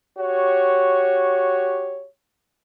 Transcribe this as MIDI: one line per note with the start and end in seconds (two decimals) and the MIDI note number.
0.18 2.04 66
0.18 2.04 67
0.18 2.04 73